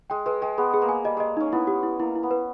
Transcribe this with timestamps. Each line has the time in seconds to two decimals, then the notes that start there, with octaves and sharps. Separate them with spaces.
0.10 G#3 G5
0.26 G#3 B4
0.42 G#3 G5
0.58 B3 G#4
0.74 G#4
0.82 A#3
0.89 G#5
1.04 G3 D#5
1.17 G#3 D#5
1.37 C#4 D#4
1.52 B3 E4
1.67 G4
1.83 E4
1.99 A#3 E4
2.16 E4
2.23 B3
2.31 B4